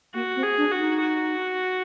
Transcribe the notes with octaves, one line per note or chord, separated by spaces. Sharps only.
A#3 F#4
C4
G#4
D4
F#4
D#4
F#4